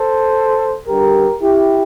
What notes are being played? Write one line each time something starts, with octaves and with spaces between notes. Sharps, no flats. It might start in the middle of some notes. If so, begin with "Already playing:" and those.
Already playing: A4 C5
G2 D3 G3 G4 A#4
E4 G4